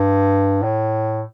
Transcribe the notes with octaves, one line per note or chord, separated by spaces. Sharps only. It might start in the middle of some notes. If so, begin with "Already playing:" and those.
Already playing: G2
A2